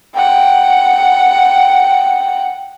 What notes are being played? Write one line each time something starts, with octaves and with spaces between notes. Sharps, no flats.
F#5 G5